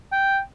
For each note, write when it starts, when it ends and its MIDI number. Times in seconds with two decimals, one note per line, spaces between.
0.12 0.39 79